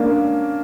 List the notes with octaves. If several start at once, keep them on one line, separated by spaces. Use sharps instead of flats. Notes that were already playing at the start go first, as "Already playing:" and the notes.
Already playing: A#3 C#4 D4